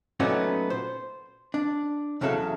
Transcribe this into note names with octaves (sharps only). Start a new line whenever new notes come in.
A#2 F#3 A3 B3 C#4 D#4
C5
D4
E2 C#3 F#3 A4 E5 F5